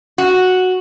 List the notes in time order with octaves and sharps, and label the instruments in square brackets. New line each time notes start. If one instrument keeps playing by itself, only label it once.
[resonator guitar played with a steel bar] F#4